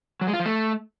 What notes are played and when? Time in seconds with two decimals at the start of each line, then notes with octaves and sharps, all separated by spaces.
0.21 F#3
0.27 G#3
0.34 F4
0.40 F3
0.46 A3